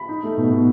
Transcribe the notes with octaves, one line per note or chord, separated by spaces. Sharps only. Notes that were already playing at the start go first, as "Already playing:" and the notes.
Already playing: B5
D#4
A3
B2
B2